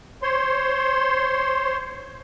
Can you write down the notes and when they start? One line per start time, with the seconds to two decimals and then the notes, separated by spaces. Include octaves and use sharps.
0.22 C5 C#5 C6